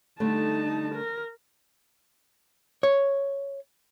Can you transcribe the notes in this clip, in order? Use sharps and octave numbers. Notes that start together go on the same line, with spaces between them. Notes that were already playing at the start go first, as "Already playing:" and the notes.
D3 G3 A3 D#4 A5
A#4
C#5